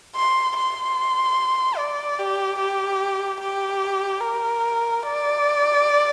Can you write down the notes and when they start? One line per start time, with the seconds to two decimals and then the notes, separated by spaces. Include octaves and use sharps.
0.16 C6
0.56 C6
1.77 D5
2.19 G4
2.59 G4
3.40 G4
4.21 A#4
5.03 D5